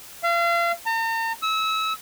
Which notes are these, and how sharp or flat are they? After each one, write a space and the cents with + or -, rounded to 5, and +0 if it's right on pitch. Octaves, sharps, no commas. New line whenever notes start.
F5 -35
A#5 -45
E6 -30